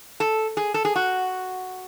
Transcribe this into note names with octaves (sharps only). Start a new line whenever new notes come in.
A4
G#4
A4
G#4
F#4